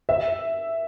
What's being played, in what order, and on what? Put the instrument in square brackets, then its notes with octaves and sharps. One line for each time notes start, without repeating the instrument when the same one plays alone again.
[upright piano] E5